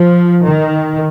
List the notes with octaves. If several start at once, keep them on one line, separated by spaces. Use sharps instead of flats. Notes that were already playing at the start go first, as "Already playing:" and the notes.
Already playing: F3
D#3